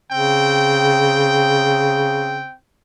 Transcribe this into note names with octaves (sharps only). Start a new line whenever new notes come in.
C#3 C4 G5